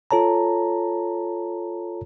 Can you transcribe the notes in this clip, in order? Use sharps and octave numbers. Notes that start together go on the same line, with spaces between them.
F4 A4 C#5 A5 A#5